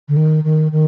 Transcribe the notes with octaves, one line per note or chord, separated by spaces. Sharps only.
D3
D#3
D#3
D#3